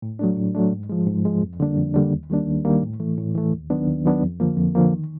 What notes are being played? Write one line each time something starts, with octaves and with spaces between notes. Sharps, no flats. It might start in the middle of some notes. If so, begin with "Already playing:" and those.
A2
F#3 A3 D4
A2
F#3 A3 D4
G#2
F3 G#3
G#2
F3 G#3
F2
D3 G3 A#3 D4
F2
D3 G3 A#3 D4
D#2
D#3 G3 A#3 D4
D#2
D#3 G3 A#3 D4
A2
E3 A3
A2
E3 A3
D#2
D#3 F#3 B3 D4
D#2
D#3 F#3 B3 D4
F2
D3 F3 A#3
F2
D3 F3 A#3
D#3